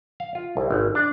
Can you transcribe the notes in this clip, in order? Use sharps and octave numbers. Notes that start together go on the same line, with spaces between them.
F5
F4
C2
G#1
D4